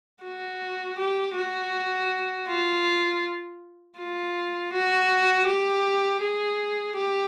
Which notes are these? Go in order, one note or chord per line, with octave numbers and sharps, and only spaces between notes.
F#4
G4
F#4
F4
F4
F#4
G4
G#4
G4